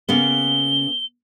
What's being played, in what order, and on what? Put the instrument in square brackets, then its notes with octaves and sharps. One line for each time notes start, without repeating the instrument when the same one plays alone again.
[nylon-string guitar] C#3 A#3 B3 [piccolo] G7